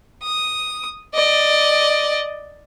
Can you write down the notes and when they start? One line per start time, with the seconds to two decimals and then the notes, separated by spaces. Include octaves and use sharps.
0.23 D#6
1.15 D5 D#5